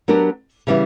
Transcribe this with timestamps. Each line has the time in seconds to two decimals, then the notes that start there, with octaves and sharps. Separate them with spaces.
0.08 F#3 B3 D4 G4 A#4
0.67 C#3 E3 G3 B3 E4